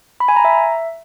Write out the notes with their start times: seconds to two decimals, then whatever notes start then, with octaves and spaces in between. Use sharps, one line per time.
0.20 B5
0.28 G#5
0.36 A#5
0.45 E5